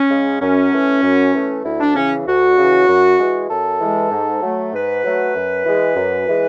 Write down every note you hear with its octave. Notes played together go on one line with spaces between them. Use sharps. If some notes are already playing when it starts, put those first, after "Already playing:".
Already playing: C#4
C#3 G#3
F#2 C#4
E3 A3
F#2
E3 A3
D2 E4
D4
C#3 E3 C#4
D2 F#4
C#3 E3
F#2
E3 G#3
F#2 A4
E3 G#3
G#2
F#3 A3
G#2 B4
F#3 A3
F#2
E3 G#3
F#2
E3 G#3